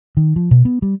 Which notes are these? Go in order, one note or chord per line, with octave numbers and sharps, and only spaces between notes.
D#3
F3
B2
B3
G3